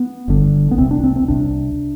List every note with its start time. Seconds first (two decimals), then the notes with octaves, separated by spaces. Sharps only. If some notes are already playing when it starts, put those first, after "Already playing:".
Already playing: B3
0.28 G1 G2 D3
0.71 B3
0.78 C2 C3 C4
0.91 D4
1.04 C4
1.16 C4
1.28 C2 C3 D4